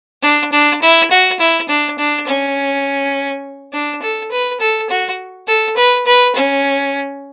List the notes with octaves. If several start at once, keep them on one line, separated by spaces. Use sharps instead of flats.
D4
D4
E4
F#4
E4
D4
D4
C#4
D4
A4
B4
A4
F#4
A4
B4
B4
C#4